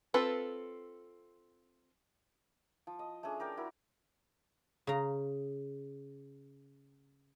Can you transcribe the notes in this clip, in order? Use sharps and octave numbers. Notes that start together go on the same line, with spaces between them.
C4 F4 A4 B4
F3
D#5
A3 C#4 D4 G#4
A#4 D5 G5
E4 F#4 A#4
C#3 A#5